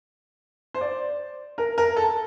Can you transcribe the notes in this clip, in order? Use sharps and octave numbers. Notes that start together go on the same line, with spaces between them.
C5
D5
A#4
A#4
A4